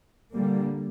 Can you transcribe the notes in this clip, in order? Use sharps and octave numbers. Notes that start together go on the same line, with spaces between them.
D3 G3 A#3